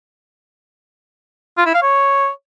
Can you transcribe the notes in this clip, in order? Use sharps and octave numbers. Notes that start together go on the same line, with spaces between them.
F4
E4
F5
C#5